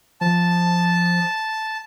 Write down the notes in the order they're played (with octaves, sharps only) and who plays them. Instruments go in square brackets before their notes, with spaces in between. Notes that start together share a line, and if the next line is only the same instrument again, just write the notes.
[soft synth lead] F3 [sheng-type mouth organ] A5